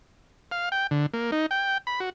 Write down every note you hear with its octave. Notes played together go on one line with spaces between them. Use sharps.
F5
G5
D3
A#3
D#4
G5
B5
F#4